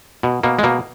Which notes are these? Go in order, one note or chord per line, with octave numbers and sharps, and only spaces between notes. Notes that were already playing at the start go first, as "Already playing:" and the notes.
B2
B2 A#3
G#3
B2 A#3